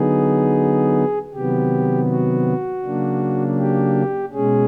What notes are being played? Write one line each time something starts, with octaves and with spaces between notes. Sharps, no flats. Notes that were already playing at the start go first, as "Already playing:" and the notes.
Already playing: D3 F#3 B3 D#4 G#4
C3 D#3 F#3 B3 G4
F#4
C#3 F#3 A#3 D4
G4
B2 G#3 C#4 G#4